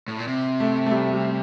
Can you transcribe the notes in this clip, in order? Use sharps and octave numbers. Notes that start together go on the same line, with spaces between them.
A2
A#2
C3
A3
A3
G3
G3